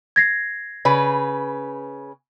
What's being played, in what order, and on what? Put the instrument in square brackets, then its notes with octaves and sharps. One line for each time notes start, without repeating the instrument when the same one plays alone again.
[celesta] G#6 A#6 C7
[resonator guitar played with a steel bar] C#3 B4